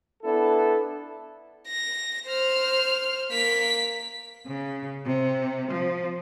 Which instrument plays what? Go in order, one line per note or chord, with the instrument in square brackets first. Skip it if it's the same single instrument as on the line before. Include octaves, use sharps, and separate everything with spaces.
[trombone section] B3 D4 E4 A4
[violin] A#6
C5 F6
A#3 B6
[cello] C#3
C3
F3